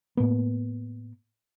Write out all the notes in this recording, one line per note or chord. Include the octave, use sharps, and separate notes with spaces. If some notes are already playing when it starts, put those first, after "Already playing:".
A2 A#3 B3